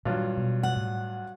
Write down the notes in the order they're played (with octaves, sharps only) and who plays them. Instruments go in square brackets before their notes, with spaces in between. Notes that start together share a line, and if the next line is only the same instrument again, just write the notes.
[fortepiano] G2 F#3 F4 [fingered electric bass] A#2 D#3 G3
[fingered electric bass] B2
[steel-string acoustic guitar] F#5
[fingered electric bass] A2